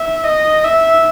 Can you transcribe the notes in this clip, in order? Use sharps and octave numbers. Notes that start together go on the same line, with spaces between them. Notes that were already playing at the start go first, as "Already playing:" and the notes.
Already playing: E5
D#5
E5